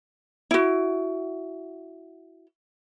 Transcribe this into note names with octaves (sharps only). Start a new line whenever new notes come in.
E4 F#4